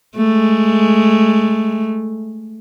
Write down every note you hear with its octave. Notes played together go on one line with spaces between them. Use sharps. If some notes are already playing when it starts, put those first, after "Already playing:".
G#3 A3